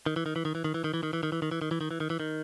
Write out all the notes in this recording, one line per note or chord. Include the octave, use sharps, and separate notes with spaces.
D#3
E3
D#3
E3
D#3
E3
D#3
E3
D#3
E3
D#3
E3
D#3
E3
D#3
E3
D#3
E3
D#3
E3
D#3
E3
D#3